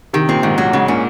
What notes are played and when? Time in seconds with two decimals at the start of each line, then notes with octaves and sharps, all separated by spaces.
0.13 C3 D#3
0.29 A#2 C4
0.43 G#2 D#3
0.58 A#2 F#3
0.73 G#2 C#3
0.88 A#2 C#4